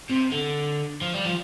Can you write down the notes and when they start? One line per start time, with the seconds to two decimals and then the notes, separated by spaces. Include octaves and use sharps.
0.10 C3
0.32 D3
1.02 F3
1.14 G3
1.25 F3